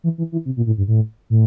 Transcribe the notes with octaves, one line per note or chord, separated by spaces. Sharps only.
E3
E3
E3
C3
A#2
A2
G2
A2
A2